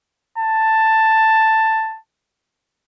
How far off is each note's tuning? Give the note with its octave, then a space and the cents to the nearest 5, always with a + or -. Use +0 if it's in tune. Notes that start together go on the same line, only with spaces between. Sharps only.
A5 +10